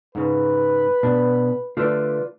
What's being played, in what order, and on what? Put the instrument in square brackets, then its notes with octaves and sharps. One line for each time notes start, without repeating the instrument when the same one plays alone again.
[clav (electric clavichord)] G#2 C#3 [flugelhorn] B4
[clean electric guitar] B2 [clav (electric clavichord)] D4
[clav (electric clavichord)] D3 A3 [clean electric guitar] F4 B4 D5